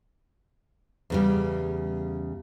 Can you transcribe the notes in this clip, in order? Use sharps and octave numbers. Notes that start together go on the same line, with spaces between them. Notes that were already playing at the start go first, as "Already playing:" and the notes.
E2 C#3 G3